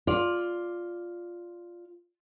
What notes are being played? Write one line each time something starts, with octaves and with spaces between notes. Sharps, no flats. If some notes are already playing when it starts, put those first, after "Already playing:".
F4 D5